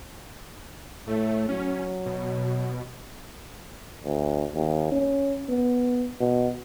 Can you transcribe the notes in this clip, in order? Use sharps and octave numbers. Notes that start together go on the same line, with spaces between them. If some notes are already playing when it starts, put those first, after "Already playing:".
A2 A3
F#3 C#4
B2
D2
D#2
C#4
B3
B2